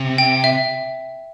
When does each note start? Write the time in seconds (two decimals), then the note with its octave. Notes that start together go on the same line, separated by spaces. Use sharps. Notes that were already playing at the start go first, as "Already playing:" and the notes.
Already playing: C3
0.18 G5
0.44 E5